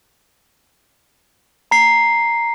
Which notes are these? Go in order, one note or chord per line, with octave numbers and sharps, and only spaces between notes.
A#5 C7